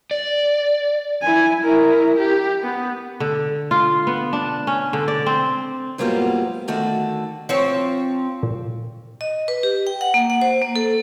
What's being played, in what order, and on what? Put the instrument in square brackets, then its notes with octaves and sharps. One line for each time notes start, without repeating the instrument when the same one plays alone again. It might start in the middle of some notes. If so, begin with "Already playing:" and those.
[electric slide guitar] D5
[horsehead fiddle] E4 G#5
E4 A#4
G4
B3
[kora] D3
F4
B3
D4
C#4
D3
D5
C4
[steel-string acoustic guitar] G#2 F#3 G3 A#3 B3 F4
D3 D#3 A3 F#4 A4
[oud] F3 C4 C#5
[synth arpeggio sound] A#2
[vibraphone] D#5
B4
G4
G5
F#5
A#3
F#5
C5
A#3
A4